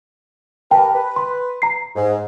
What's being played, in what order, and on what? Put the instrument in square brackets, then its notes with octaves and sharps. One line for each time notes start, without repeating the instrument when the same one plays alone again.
[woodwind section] G4 A#4 B4 [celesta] G5 A5
[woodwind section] B4
[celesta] C6
A#5 C7
[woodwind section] G#2